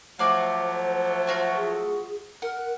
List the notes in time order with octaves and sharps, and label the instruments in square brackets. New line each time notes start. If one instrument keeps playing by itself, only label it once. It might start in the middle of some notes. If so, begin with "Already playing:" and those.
[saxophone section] F3 F#3 A3 [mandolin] F#4 D5 F5 [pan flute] C5
[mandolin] F4 F#4 C#6
[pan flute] G#4
[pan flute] A#4 [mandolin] F#5